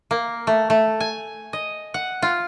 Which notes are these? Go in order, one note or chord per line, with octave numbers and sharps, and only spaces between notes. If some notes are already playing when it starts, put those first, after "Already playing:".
A#3
A3
A3
G#5
D#5
F#5
F4